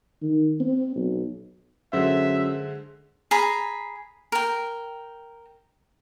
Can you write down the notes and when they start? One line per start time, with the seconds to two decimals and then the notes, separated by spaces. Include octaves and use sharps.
0.22 D#3
0.60 C4
0.96 B1
1.93 F#2 D3 G#3 C5 E5
3.31 G#4 A#5 B5
4.32 A#4 G5